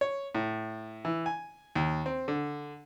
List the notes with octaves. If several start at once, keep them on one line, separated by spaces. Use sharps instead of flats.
C#5
A2
E3
G#5
D#2
C4
D3